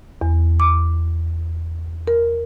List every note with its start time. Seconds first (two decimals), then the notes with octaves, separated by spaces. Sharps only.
0.21 E2
0.60 D6
2.08 A#4